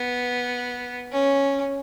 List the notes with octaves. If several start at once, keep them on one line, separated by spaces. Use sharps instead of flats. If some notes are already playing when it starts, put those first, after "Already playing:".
Already playing: B3
C#4